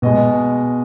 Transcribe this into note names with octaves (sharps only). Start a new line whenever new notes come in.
B2 G#3 D#5